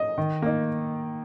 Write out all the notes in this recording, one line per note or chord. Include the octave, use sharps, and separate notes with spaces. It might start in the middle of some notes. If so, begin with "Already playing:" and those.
Already playing: D#5
D#3
A#3 D#4